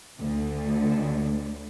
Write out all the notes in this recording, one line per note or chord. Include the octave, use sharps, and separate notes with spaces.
D2 D3